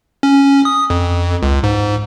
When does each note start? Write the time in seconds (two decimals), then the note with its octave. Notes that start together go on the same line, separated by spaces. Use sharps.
0.23 C#4
0.65 D#6
0.90 F2
1.43 C#2
1.63 G#2